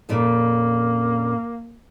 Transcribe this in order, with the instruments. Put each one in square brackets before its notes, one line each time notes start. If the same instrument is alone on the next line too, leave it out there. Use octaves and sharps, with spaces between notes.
[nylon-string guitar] F2 A#2 C#3 [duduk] A#3